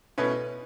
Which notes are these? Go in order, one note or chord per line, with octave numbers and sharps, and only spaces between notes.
B2 A3 C#4 E4 B4